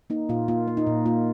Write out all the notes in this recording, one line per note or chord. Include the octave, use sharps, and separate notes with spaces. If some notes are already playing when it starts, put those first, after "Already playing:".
A#3 D#4
A#2 F4
A#3 F4
A#3
D#4
A#2
A#3 F4